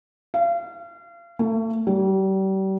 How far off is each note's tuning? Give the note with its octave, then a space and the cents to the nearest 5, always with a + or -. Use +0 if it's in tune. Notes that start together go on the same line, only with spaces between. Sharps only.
F5 -35
A3 +30
G3 -35